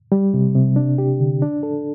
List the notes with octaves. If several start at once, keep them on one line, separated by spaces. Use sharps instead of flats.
G3
C3
C3
D4
G4
D3
D4
A4